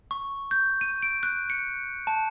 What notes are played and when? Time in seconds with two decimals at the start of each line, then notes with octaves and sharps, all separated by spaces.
0.11 C#6
0.51 G6
0.81 D#7
1.02 D7
1.23 F#6
1.50 C#7
2.07 A5